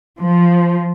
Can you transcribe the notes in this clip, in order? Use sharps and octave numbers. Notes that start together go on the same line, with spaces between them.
F3